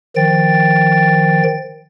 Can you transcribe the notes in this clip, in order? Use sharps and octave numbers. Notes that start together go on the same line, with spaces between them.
D#3 F3 G5 A6